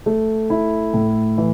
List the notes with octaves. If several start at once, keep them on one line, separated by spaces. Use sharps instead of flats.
A3
E4
A2
E3